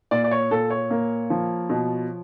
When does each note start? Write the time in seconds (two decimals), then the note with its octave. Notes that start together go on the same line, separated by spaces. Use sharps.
0.11 A#2 D5
0.24 D5
0.31 C#5
0.51 A#2 A4
0.70 C#5
0.91 A#3
1.30 F3
1.70 B2